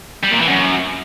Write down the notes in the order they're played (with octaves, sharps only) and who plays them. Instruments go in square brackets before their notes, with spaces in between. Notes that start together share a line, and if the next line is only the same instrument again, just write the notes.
[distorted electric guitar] G3
A#2
E3
F#2